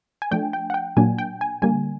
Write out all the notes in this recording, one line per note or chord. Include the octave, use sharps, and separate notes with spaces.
G#5
F3 A3 D4 G5
G5
F#5
G5
A#2 F#3 A#3 D4 G#5
G5
G#5
D3 G3 A#3 G#5